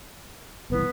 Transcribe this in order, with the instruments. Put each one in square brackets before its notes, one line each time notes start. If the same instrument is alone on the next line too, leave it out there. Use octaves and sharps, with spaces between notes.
[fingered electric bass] F#1 C2 E3 [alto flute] B3